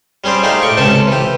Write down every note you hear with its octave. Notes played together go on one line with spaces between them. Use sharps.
G3 C#4 G#4 C5 D5
A3 D#4 G4 G#4 D5 F5
A2 G5 C#6 D6
C#2 C3 C#4 A4 A5
E3 G4